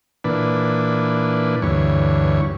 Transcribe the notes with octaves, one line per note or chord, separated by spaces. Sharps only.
A#2 E3 D4 B4
D2 G2 E3 C#5